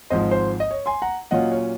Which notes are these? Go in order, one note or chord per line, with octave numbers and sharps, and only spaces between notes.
G#1 G#2 F3 C5 D#5
C5
D#5
C#5
G#5 C6
F#5 A#5
A#2 F#3 C#4 F4 D#5 F#5
C#5